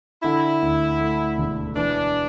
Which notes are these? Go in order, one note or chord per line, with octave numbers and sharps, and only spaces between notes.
D3 E4
D2
A3
E1
E3 D4